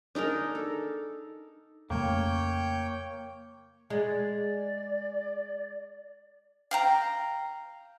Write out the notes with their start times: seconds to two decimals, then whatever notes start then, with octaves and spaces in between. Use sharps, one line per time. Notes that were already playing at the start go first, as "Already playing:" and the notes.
0.15 D4 D#4 G#4 A#4
0.55 A4
1.90 F2 C#3 A3 A#3 C#5 G5
3.90 G#3 D5
6.71 F5 G5 A#5